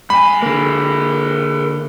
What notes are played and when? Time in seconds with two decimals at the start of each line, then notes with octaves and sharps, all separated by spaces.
0.10 G3 G#5 B5
0.42 D3 A#3 G#4 A#4